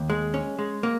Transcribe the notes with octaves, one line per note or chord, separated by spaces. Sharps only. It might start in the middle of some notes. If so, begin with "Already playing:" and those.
Already playing: D#2
G#3
C#4
G#3
A#3